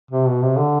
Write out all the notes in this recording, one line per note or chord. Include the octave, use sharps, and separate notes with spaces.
C3
B2
C3
D3